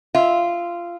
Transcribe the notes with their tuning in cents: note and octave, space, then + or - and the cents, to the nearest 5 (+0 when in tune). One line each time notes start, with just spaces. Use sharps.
F4 -15 E5 -15